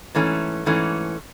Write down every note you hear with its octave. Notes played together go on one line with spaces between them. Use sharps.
G#2 E3 A3 C#4
G#2 E3 A3 C#4